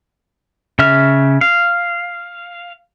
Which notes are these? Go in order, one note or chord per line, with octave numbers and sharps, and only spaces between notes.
C#3 E5 F6
F5